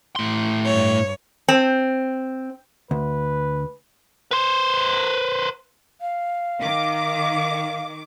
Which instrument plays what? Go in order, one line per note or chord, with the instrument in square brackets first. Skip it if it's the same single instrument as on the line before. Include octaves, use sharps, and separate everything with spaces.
[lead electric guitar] A2 C6
[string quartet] G2 C#5
[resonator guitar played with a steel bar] C4
[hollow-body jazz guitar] D2 [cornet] B4
[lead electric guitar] B4 C5
[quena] F5
[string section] D#3 D6